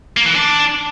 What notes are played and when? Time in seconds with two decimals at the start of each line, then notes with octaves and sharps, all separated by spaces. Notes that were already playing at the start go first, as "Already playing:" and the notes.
0.17 A#3
0.25 E3
0.34 D4